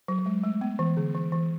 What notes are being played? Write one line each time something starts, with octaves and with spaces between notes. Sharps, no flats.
F#3
F#3
G#3
A3
B3
E3
D3
E3
E3